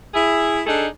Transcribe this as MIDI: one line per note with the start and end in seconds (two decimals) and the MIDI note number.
0.14 0.62 64
0.14 0.62 68
0.67 0.86 62
0.67 0.86 63
0.67 0.86 68
0.67 0.86 69